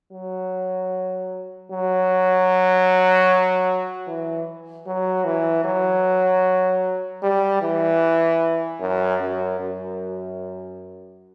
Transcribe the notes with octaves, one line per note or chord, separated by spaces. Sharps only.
F#3
F#3
E3
F#3
E3
F#3
G3
E3
F#2
F#2
F#2